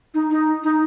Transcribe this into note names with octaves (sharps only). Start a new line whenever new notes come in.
D#4
D#4
D#4